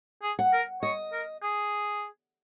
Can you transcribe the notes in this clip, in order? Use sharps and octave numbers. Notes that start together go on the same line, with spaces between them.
G#4
F#5
A#4
C#5 D#5
A#4
G#4